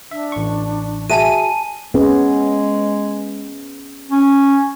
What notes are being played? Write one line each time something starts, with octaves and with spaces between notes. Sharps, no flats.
D4 E5
A1 C#6
F#4 G#4 E5 G#5 A5 D#7
G#3 B3 C#4 G#4
C#4